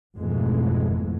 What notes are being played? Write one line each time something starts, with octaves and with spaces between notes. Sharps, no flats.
G#1 F2 B2 E3 G#3 A3